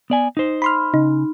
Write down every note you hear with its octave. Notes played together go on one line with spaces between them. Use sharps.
B3 D5 G#5
D#4 C5
B5 C6 F6
C#3 D#4